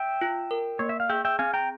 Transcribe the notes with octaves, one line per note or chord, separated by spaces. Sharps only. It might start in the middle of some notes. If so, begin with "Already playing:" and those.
Already playing: E5 G5
F4
A#4
A#3 C#5
E5
F5
G#4 E5 G5
E5 G5
C4 F5 G#5
G5 A#5